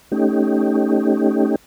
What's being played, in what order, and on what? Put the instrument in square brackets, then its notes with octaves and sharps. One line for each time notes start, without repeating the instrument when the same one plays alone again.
[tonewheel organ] A3 C#4 D#4 G4